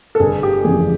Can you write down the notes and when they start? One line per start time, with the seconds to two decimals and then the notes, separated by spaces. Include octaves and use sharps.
0.15 A4
0.19 G1 G#4
0.43 G4
0.64 F2 C#3 E3 G#4
0.81 G#4